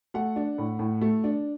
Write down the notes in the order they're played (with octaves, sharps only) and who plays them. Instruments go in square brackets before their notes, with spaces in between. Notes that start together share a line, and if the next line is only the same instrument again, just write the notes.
[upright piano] A3 F#5
D4
A2
A2
A3
D4